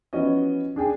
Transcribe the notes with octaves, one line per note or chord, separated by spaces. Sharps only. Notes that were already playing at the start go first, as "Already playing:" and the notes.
E3 F3 B3 C#4 F#4 D#5
D4 G#4 G5 G#5